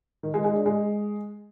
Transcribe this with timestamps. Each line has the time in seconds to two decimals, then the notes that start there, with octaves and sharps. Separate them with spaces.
0.23 D#3
0.34 G#3
0.44 G#3
0.55 D4
0.66 G#3